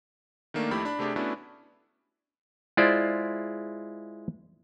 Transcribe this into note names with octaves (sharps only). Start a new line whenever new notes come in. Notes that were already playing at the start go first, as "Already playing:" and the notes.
D#3 A3 A#3 D4 A#4
F2 A3 E4 G4 B5
D4 B5
C3 A3 D4 G4 G#4
A3 B3 C#4 D4 E4 F#4
G#3 E4 F4 C5 D5